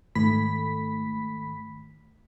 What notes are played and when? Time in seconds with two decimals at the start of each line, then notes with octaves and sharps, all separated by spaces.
0.15 G#2 D#3 A3 B5 B6